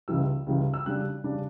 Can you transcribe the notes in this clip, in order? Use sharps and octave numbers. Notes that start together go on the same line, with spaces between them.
C#2 C#3 E3 G3 E6
C#2 C#3 E3 G3
E6
C#3 G3 D4 F#6
C#3 G3 D4